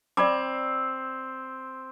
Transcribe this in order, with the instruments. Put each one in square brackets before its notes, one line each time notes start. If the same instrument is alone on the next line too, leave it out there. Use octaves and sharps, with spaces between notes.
[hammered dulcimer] C4 [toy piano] D5 B5 D6